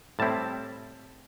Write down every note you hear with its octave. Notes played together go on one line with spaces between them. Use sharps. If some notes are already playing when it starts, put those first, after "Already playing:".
A2 G3 C4 E4 A5